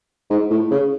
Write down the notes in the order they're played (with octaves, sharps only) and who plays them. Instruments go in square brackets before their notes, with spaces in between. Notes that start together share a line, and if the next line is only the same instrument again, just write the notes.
[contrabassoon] G#2
A2
C#3